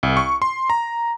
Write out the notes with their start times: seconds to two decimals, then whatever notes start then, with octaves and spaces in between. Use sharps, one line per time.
0.03 C2
0.17 C#6
0.42 C6
0.70 A#5